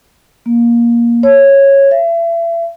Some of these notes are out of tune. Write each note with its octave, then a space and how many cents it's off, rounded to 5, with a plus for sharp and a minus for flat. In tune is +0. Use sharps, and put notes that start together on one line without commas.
A#3 +15
C#5 -10
E5 +35